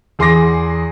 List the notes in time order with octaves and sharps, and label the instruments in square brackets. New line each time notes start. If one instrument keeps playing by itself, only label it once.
[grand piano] E2 G#4 C6 D6 A#6